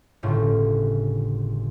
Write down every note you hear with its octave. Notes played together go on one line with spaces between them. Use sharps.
G1 A2 C#3 F4